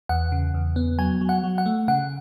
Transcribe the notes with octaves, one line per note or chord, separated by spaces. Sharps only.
E2 F#5
C#3
E2
B3
F#3 G#5
F#3
F#5
F#3
F#5
A3
C#3 F#5